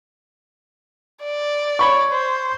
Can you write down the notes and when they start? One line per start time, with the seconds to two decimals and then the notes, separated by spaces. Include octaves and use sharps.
1.23 D5
1.79 C#5 B5 C#6
2.11 C5